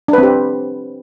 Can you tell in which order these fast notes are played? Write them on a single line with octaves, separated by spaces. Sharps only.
D4 B4 C4 G4